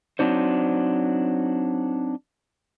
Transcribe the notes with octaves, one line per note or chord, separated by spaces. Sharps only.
F#3 C4 D4 D#4 C5